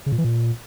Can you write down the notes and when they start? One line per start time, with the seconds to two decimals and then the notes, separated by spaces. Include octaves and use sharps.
0.06 C#3
0.12 A#2
0.18 E3
0.24 A#2